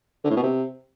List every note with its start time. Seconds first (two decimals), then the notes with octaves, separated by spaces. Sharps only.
0.24 D3
0.30 A2
0.37 B2
0.43 C3